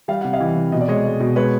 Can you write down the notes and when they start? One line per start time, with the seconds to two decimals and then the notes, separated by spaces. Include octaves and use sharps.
0.08 G3 F5
0.21 C3 F#5
0.33 D#5 F5
0.41 E3
0.56 C3
0.72 B2 D#5
0.81 D5
0.88 G#3 C#5 D#5
1.04 G#3
1.20 B2
1.36 G#3 B4 C#5